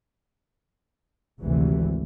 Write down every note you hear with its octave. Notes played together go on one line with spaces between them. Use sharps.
G#1 D2 C3 E3